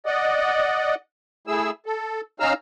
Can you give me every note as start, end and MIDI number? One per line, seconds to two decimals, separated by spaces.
0.06 0.95 74
0.06 0.95 75
0.06 0.95 78
1.47 1.71 57
1.47 1.71 64
1.47 1.71 68
1.47 1.71 88
1.86 2.21 69
2.40 2.53 61
2.40 2.53 63
2.40 2.53 77
2.40 2.53 82
2.40 2.53 88
2.40 2.53 89